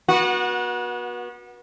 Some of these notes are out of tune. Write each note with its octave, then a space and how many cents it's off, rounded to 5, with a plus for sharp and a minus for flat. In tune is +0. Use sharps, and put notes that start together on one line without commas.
B3 -35 F#4 -15